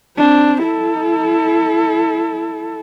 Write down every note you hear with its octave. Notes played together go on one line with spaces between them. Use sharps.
C4 D4
E4 A4